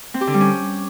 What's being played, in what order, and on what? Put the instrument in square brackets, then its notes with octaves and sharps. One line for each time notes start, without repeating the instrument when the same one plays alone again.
[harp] C4
G4
D3
G3
C#4